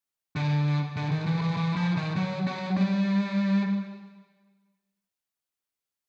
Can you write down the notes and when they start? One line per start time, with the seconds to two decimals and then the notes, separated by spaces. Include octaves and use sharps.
0.36 D3
0.96 D3
1.11 D#3
1.26 E3
1.41 E3
1.57 E3
1.76 F3
1.97 D#3
2.16 F#3
2.47 F#3
2.77 G3